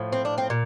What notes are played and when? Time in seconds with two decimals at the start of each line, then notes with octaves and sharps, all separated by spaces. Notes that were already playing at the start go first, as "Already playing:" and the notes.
Already playing: A2 F3
0.13 C4
0.25 D4
0.38 C4
0.50 A#2